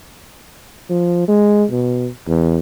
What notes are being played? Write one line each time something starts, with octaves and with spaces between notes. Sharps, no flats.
F3
G#3
B2
E2